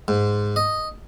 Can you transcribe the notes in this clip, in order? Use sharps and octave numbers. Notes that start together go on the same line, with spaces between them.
G#2
D#5